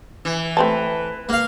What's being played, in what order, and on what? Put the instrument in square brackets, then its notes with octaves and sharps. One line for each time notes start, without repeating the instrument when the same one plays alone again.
[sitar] E3
[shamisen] A3 C4 A5 [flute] B4
[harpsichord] A#3 F5